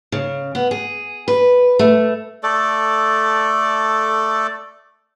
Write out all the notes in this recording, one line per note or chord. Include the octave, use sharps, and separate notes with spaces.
C#3
B3
G#4
B4
A3
A3 A4 D5